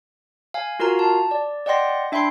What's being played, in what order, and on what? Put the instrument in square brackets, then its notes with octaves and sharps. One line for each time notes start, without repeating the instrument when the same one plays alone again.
[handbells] F5 G#5
F4 F#4 A#4 F5 A#5
A5
D5
D5 D#5 F#5 G5 C6 A#6
D4 E5 G5 B5 C6 C7